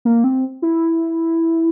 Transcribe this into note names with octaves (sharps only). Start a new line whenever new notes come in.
A#3
C4
E4